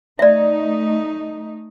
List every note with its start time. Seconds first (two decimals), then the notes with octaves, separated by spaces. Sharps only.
0.19 A3 D#4 D5 E5